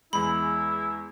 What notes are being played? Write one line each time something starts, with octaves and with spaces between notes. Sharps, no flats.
E2 G#3 E4 B5